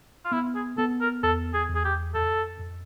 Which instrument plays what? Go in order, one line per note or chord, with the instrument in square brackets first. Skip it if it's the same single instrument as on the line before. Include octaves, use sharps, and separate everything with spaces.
[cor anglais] F4
[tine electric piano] B3 [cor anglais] E4
[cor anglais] G#4
[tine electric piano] B3 [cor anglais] A4
[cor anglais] A#4
[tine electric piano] E2 [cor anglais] A4
[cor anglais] G#4
[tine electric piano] E2
[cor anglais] G#4
G4
[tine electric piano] F2 [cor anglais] A4
[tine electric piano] F2